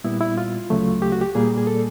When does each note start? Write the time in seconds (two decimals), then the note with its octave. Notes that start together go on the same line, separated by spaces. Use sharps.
0.04 A#2 G3 B3 E4
0.21 E4
0.38 F4
0.70 D2 C#3 F#3 A3
1.02 G4
1.12 F#4
1.21 G4
1.35 A#2 G3 A#3 G#4
1.58 G#4
1.67 A4